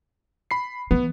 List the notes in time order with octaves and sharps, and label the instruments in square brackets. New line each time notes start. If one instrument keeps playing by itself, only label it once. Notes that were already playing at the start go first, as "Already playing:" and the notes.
[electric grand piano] B5 C7
[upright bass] E3 [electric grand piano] B3